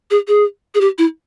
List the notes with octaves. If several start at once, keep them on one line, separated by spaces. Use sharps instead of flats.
G#4
G#4
G#4
G4
E4